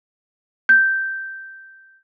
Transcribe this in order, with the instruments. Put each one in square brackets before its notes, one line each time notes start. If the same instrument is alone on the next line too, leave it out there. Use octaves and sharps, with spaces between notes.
[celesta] G6